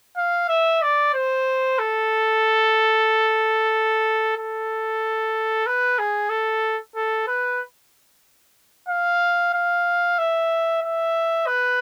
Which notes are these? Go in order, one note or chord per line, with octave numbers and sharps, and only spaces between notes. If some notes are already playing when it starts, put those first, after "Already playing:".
F5
E5
D5
C5
A4
A4
B4
G#4
A4
A4
B4
F5
F5
E5
E5
B4